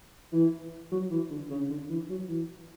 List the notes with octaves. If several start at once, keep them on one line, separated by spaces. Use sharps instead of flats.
E3
F#3
E3
D3
C#3
D3
E3
F#3
E3